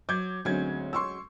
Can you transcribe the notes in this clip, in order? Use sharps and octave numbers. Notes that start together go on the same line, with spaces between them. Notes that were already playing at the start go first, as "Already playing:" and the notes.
F#3 D6 G6 G#6
D2 F#3 G#3 C4 C#4 G#6
C6 C#6 E6